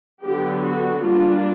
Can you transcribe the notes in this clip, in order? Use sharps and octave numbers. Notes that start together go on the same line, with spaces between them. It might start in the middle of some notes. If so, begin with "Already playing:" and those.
D3 F#3 B3 G4
F#4
G3 A#3 D4 F4